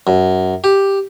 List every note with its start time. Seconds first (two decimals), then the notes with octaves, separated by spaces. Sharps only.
0.07 F#2
0.64 G4